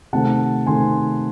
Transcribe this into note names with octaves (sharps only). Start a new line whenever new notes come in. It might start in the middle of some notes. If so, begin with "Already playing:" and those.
C3 D#3 A3 C4 F#5 A5
C3 D#3 A3 C4 G#5 C6